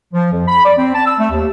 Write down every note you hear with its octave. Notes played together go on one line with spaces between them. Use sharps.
F3
F2
B5
D5
C4
A5
E6
A3
D#2